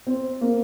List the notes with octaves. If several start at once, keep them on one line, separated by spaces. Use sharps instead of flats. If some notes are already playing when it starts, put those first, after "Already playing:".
C4
A#3